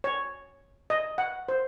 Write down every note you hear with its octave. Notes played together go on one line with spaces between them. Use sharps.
C#5
D#5
F#5
C5